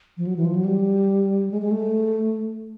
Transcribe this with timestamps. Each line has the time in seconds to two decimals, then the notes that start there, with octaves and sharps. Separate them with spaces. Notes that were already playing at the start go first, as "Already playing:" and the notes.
0.17 F3
0.27 F#3
0.36 E3
0.45 F3
0.55 F#3
0.65 G3
1.51 G#3
1.62 G#3
1.71 A3